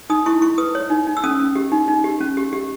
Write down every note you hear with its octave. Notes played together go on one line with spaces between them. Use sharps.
D#4 D#6
E4 C#6
E4 C#6
B4 D#6
C#5
D#4
D#4
E6
C#4 D#6
C#4
G4
D#4
D#4
G4
C#4
G4
G4